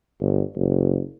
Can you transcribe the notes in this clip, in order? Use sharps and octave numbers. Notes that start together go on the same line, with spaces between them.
G1
F#1